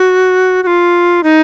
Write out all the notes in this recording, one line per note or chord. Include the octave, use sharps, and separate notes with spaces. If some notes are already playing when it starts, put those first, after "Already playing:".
Already playing: F#4
F#4
F4
D#4